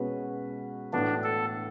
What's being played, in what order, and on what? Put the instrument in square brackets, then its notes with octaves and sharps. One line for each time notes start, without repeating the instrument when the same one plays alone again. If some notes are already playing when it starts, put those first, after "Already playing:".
Already playing: [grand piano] B2 G#3 C#4 F#4 B4
[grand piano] A2 E3 B3 F#4 [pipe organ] D4
[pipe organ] A4